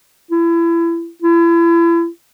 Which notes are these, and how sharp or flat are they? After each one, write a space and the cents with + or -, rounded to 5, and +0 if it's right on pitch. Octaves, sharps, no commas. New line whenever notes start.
E4 +30
E4 +35